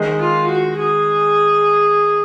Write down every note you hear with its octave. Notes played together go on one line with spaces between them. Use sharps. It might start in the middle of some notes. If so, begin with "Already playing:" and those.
Already playing: D#3 G#3 D#4
F4
F#4
G#4